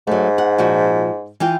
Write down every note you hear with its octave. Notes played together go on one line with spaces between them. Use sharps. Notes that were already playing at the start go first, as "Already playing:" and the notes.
G#2 F#3 A3
F#5
A#2 F3 F#4
E3 F4 G5